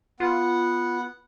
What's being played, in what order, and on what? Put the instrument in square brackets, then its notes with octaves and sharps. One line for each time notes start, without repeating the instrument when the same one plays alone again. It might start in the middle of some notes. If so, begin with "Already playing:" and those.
[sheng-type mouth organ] B3 F#5 [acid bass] F4